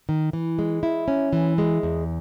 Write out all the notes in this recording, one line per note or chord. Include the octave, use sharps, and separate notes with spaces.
D#3
E3
G#3
E4
C#4
E3
G#3
E2